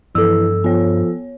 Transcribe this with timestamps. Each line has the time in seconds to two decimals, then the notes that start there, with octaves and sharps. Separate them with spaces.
0.15 G2 E3 F3 A4 E6
0.64 F3 B3 C#5